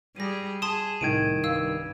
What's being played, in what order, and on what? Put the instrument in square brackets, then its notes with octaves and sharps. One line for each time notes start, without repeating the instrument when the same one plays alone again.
[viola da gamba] G3 G#4 [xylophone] A#6 D#7
[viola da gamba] G#4 [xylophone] A5 C6 D#6 [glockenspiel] E7
[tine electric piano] C2 D#3 [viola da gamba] A2 [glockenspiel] G#6 D7 D#7
[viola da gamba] G2 [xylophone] F5 E6